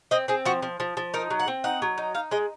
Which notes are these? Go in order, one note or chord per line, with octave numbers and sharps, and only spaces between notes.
C4 D#5
C4 G#4
F3 F#4
F3
F3
F3
D#4 A#4
F#3
F#5
C4
D#4 F#5
F#3
D#4
D#4 F5
G#3 D#5